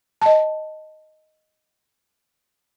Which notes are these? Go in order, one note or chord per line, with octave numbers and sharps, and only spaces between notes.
D#5 A5